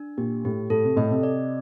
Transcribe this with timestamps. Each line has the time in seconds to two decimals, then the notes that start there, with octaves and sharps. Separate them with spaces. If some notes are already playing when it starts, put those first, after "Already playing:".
Already playing: D4
0.18 A#2 G4
0.45 A2 G4
0.70 A2 A4
0.84 C3
0.96 A2 D#5
1.10 C3
1.23 D5